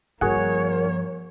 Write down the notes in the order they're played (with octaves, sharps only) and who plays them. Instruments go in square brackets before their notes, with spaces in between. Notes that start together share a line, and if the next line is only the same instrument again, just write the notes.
[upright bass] G2 F3 [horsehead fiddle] A#3 C#5 [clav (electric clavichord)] F#4 G#4 F#5 [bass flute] A#4